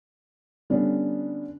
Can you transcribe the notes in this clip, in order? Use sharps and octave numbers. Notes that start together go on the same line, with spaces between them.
D3 G3 B3 C#4 D4